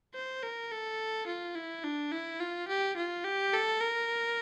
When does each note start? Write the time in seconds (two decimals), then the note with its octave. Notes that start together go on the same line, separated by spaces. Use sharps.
0.15 C5
0.42 A#4
0.71 A4
1.27 F4
1.55 E4
1.84 D4
2.12 E4
2.40 F4
2.68 G4
2.97 F4
3.24 G4
3.53 A4
3.81 A#4